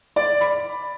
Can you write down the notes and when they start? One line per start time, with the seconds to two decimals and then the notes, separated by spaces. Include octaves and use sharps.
0.16 D5
0.41 B5